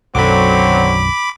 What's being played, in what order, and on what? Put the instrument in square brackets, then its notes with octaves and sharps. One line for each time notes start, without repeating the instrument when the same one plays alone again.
[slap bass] B1 F#2 D#3 [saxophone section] D3 F#3 [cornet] C4 [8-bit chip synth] B5 D6